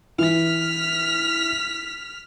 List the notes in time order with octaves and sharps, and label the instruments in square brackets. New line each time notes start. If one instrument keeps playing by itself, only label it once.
[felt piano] E3 [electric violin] F6 B6